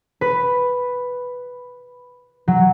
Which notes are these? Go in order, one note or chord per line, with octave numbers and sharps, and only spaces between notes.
B4
F#3